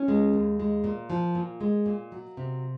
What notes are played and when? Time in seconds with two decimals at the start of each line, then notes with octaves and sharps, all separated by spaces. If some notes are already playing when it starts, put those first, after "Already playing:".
Already playing: C#4
0.08 G#3
0.33 D#2
0.60 G#3
0.84 A#2
1.10 F3
1.35 A#2
1.61 G#3
1.86 A#2
2.12 F#3
2.37 C3